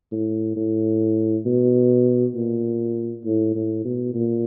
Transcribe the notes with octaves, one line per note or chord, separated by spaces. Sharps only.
A2
A2
B2
A#2
A2
A2
B2
A#2